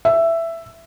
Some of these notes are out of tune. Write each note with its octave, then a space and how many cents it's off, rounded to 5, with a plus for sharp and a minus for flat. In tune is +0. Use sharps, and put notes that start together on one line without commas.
E5 +10